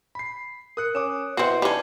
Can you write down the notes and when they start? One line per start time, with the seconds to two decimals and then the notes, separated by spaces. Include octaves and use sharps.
0.15 B5 C7
0.77 A#4 D#6 F#6 C#7
0.95 C#4 D6 D#6 E7
1.37 B2 C4 E4 F#4 B4 E5 C7
1.62 G3 C#4 D#4 A5